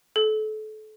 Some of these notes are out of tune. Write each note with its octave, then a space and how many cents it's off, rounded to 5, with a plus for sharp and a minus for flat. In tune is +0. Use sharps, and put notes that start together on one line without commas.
A4 -30